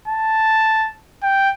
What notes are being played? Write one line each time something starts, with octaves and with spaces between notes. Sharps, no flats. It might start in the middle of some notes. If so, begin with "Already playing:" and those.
A5
G5